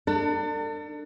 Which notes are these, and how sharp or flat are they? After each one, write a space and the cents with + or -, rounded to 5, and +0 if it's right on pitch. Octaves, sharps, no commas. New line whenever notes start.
D4 +25 A4 +45